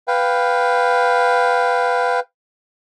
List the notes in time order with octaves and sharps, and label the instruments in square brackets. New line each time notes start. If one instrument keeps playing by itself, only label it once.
[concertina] B4 F5 G5